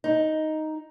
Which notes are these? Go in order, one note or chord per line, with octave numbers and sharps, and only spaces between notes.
D#4